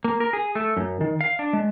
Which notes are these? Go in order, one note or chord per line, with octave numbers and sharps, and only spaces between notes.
A#3
A#4
G#4
A3
F#2
D#3
F5
D4
G#3